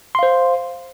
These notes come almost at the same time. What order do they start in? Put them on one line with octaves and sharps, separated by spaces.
C6 F5 C5